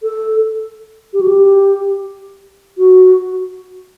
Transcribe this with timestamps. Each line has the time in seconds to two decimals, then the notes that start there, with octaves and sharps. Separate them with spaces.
0.03 A4
1.13 G4
1.21 F#4
1.28 G4
2.78 F#4